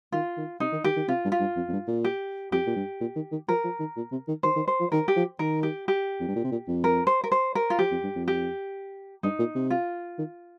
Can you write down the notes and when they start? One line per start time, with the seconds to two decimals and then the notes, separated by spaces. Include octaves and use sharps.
0.12 D#3 F4
0.37 D#3
0.60 C3 D#4
0.72 D#3
0.84 D#3 G4
0.96 D#3
1.08 C3 F4
1.24 G2
1.32 F4
1.40 G2
1.56 F2
1.68 F2
1.73 G2
1.88 A#2
2.04 G4
2.52 F2 G4
2.67 A#2
2.76 G2
3.01 A#2
3.16 D#3
3.32 D#3
3.48 F3 A#4
3.64 F3
3.79 D#3
3.96 A#2
4.12 C3
4.28 D#3
4.43 D#3 C5
4.56 D#3
4.68 C5
4.80 F3
4.92 D#3 A#4
5.08 G4
5.16 F3
5.39 D#3 A#4
5.63 G4
5.88 G4
6.20 F2
6.28 G2
6.36 A#2
6.44 C3
6.51 A#2
6.68 F2
6.84 A#4
7.07 C5
7.24 A#4
7.32 C5
7.55 A#4
7.70 F4
7.79 F3 G4
7.91 F2
8.03 G2
8.15 F2
8.28 G4
9.23 G2 D#4
9.39 A#2
9.55 C3
9.70 F4
10.18 D#3